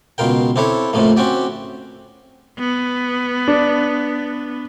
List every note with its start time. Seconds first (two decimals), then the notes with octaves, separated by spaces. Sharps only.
0.18 C#2 B2 F4 A#4 G5
0.56 C4 D4 E4 A4 C#5
0.93 F2 A2 C3 F3 A3 A#3
1.17 C4 C#4 F#4 G4 D5
2.59 B3
3.48 D4